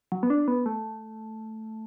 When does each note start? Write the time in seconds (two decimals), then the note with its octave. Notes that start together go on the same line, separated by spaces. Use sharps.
0.12 F#3
0.23 B3
0.30 D4
0.48 B3
0.66 A3